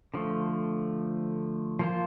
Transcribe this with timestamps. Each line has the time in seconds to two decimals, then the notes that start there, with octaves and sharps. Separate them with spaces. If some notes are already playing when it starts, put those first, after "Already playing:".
0.14 D3 F3 A3
1.79 F3 A#3 F4 C5